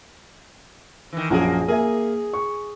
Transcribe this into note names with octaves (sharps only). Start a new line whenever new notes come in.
D#3 E3
A#1 F#2 A#3 G#4
A#3 G#4 E5 G#5
C#6